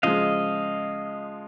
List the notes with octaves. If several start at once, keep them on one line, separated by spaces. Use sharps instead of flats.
C#3 F3 G#3 D#5 F5